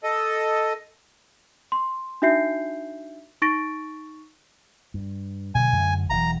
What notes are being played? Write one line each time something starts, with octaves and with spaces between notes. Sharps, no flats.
A4 D#5
C6
D4 D#4 F#4 E5 G6 C7
D#4 C#6 A6 A#6 D7
G2
B2 D3 F#3 G#5
F#2 D3 G#3
E1 E3 F#3 A#5